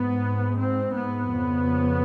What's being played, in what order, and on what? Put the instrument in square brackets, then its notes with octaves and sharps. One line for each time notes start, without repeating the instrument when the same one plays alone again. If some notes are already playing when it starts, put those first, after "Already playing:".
Already playing: [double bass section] G#2 B3
C4
B3
F2 C#3